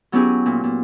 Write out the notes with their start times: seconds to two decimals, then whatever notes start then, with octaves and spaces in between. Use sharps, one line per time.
0.12 F#3 B3 C#4 E4 G4 G#4
0.46 A#2
0.64 A#2